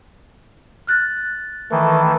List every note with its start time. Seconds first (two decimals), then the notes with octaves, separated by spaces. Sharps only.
0.87 F6 F#6 A6
1.71 D#3 E3 A3